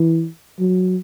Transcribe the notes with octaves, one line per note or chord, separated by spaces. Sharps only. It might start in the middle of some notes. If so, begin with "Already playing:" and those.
Already playing: E3
F#3